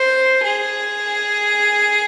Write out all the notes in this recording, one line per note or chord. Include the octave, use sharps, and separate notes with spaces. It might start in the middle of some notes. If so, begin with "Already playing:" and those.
Already playing: C5
G#4